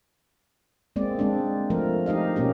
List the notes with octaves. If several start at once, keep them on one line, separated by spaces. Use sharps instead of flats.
G#3 A#3 C4 D5
G#3 C4 D4
F3 A3 A#4
D#4 G4 D#5 F5
B2 A#3 C#4 G4